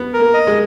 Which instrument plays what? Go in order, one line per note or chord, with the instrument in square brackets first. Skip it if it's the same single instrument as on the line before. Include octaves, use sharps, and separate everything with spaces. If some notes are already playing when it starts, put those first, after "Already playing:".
Already playing: [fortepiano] B3
[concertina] A#4
[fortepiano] A#3
[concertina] D#5
[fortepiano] G#3